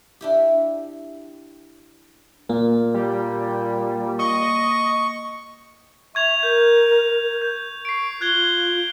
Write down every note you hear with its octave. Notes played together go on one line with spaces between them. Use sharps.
D4 E4 G4
A#2 A#3
G3
D#5 C#6
E5 C#6 G#6 F7
A#4 G6
G6
C#6 C7 D7
F4 F#6 G#6 G7